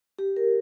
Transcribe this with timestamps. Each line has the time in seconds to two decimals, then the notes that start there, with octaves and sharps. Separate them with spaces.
0.19 G4
0.37 A#4